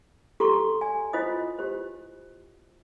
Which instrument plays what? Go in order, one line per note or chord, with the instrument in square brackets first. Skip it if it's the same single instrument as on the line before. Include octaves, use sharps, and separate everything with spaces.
[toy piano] G4 A4 A#5 C6 C#6
D5 G#5
E4 F4 C5 D#5 D#6
G4 C5